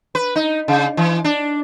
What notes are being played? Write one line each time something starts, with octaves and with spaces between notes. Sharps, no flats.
B4
D#4
C#3
E3
D4